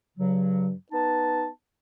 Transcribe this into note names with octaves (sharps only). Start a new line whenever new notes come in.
G2 C#3 F#3
B3 D#4 A5